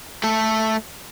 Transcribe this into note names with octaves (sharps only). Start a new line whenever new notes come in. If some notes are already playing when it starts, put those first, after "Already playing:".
A3 A4